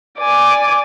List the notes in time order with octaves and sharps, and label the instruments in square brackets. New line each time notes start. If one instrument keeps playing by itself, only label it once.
[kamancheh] D5 G#5